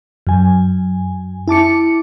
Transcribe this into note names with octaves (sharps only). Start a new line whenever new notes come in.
F#2 G#5
E4 A5 D6 C#7